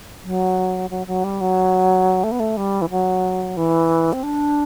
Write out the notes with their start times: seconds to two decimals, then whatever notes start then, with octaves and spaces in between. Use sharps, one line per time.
0.24 F#3
0.90 F#3
1.07 F#3
1.24 G3
1.41 F#3
2.24 A3
2.32 B3
2.40 A3
2.57 G3
2.82 E3
2.90 F#3
3.57 E3
4.13 C4
4.23 D4